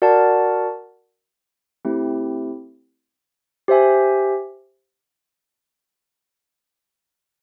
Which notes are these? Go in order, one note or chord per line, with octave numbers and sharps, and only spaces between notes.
F#4 A#4 D5 F#5 A5
A3 C4 E4 G4
G4 C5 E5 G#5